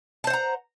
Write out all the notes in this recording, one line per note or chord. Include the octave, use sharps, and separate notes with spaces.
C5 F#5 A5 A#5